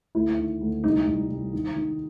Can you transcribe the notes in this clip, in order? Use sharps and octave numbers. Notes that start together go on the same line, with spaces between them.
D2 E4
D#3
D2
C2 D#4
C2
C2
D#3
D#3